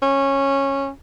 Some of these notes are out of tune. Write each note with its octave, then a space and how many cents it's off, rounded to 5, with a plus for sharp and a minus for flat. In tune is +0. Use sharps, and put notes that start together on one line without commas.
C#4 -15